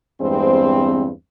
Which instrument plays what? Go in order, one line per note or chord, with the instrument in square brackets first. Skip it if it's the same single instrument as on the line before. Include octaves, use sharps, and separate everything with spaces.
[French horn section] E2 G2 G#3 C4